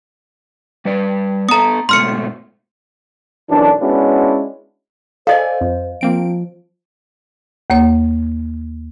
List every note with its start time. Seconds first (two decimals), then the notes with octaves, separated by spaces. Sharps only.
0.85 G3 B4 D5
1.49 B3 A4 A#5 D#6
1.89 G#2 B2 A3 C6 F6 C#7
3.50 B1 F#2 E3 D4
3.81 G#3 B3 C#4 D4 E4 F#4
5.27 A4 C5 D5 D#5 F5 G#5
5.61 F2
6.01 F3 A#3 C4 D7
7.70 D#2 A#3 C#5